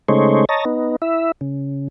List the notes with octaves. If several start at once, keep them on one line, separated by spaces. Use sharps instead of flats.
C#3 G#3 A3 D#4 C5 C#5
C#5 D#5 A5 A#5
B3 D#4
E4 E5
C#3